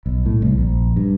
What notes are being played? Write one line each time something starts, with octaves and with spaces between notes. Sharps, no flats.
B1
A2
C2
A#1
G2